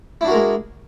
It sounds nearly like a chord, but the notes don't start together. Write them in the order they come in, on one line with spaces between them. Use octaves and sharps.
E4 D4 F#4 A#4 G#3